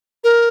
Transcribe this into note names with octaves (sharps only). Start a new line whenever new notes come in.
A#4